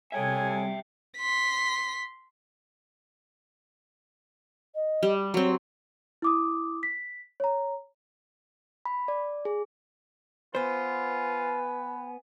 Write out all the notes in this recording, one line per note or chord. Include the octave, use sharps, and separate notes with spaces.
C3 G3 G#4 A4 C#5 E5 G5 G#5
C6 B6
D#5
G3
F#3 C4 C#5
E4 D6 D#6
B6
C#5 A#5
B5
D5
G#4
B3 F4 B4 C5 G#5